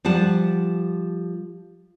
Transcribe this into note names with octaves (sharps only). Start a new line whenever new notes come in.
F3 G3 F#5 A5